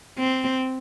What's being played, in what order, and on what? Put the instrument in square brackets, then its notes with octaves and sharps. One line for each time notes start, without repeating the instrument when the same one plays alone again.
[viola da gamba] C4